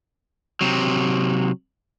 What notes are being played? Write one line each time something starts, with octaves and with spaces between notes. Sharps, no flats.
C3 F#3